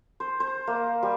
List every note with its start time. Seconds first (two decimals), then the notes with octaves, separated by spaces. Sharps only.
0.20 C5
0.40 C5
0.67 A#3
1.03 G3